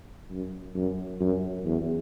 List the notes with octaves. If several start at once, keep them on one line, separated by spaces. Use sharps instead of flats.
F#2
F#2
F#2
E2